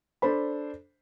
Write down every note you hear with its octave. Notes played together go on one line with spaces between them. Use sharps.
D4 A4 C5 B5